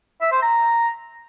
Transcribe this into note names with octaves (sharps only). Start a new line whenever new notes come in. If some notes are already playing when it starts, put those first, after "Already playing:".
E5
C5
A#5